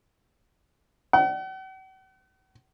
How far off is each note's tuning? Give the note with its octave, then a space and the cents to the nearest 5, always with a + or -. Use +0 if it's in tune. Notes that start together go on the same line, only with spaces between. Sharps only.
F#5 +45